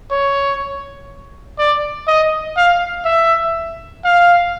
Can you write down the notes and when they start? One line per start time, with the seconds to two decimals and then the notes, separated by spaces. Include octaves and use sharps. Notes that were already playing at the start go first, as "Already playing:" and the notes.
0.11 C#5
1.59 D5
2.07 D#5
2.57 F5
3.05 E5
4.05 F5